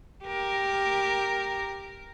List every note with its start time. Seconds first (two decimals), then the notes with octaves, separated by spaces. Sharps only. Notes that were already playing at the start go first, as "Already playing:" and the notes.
0.25 G4 A#4